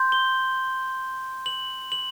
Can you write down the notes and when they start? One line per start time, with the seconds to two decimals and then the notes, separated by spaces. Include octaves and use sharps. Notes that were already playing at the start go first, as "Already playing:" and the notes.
Already playing: C6 G6
0.12 G7
1.46 F#7
1.92 F#7